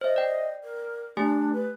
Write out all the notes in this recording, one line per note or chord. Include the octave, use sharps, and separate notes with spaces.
C5 D#5 E5
D5 G5
A#4
A3 D4 G4 G#5
B4